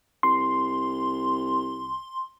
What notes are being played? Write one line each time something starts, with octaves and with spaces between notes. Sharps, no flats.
C2 C6